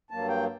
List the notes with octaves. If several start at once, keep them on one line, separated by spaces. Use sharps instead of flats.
G2 F#3 A#3 A5
G5